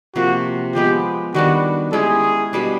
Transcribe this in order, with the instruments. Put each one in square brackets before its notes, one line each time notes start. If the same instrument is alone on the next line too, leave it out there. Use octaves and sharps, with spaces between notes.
[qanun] C3 F3 A#3 [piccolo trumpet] F#4
[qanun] F3 G#3 B3 [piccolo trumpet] G4
[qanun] D#3 G3 B3 D4 [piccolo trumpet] F#4
[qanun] G#3 C#4 E4 G4 [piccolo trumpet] G#4
[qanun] B2 G3 B3 D4